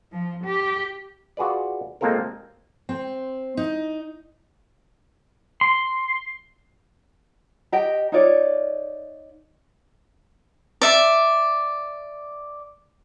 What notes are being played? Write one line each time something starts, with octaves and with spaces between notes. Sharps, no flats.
F3
G4
F4 F#4 G#4 B4 D5
G#3 A#3 C4 F4 A4 A#4
C4
D#4
C6
G4 D#5 G5
D#4 F4 C#5 D5
D5 E5